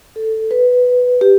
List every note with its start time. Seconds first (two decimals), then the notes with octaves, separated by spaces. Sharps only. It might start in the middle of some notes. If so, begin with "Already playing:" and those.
0.16 A4
0.51 B4
1.21 G4